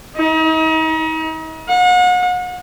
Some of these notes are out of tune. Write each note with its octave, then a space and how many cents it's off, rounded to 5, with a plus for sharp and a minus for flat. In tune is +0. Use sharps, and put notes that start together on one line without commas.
D#4 +40
F#5 -40